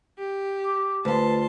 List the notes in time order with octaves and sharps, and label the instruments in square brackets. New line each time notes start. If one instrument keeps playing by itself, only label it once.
[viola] G4
[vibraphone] D6
[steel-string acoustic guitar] D2 F4 [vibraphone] B4 [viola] A5 C6